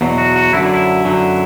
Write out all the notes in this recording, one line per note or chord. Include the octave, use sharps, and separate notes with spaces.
E2 B2 F#3
F#4
F#4
F#2 D3 F#3 E4
D4
E4
F#2 D3 F#3